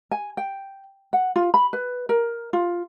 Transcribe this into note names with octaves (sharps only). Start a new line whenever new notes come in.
G#5
G5
F#5
F4
B5
B4
A#4
F4